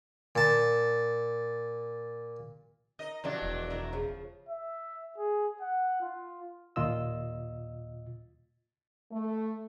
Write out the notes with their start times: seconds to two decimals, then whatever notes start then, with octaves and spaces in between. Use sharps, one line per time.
0.35 A#2 A5
2.99 D#4 A#4 D#5
3.24 F2 E3 F#3 G3 D4 D5
3.42 E1
3.70 D#3 E4 A#4
3.93 C#3 F3
4.49 E5
5.18 G#4
5.61 F#5
6.01 F4
6.76 D#2 A#2 F4 D#5 E6
9.12 A3